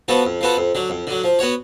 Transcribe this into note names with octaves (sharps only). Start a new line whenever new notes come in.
F3 B3 F#4 A4
F2
F3 B3 F#4 A4
F2
D3 F#3
F2
D3 F#3
F3
B3 F#4 C#5